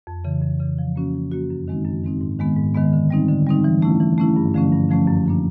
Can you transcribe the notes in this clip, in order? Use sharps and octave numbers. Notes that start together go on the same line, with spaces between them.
F2
C#3 E3
F2
C#3 E3
F3
A#3 C#4 F#4
F3
A#3 C#4 F#4
F#2
D#3 G#3 C4 D#4
F#2
D#3 G#3 C4 D#4
G#2
D#3 G#3 B3
G#2
D#3 G#3 B3
D3
G3 C4 D#4
D3
G3 C4 D#4
E3
A3 C#4 E4
E3
A3 C#4 E4
G2
D3 F3 A3 C#4
G2
D3 F3 A3 C#4
F#2
D3 F3 A#3 D4